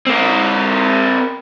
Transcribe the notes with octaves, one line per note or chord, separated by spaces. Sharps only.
C4 A#4